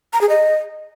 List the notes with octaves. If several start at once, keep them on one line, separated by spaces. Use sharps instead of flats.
A#5
G#4
D#5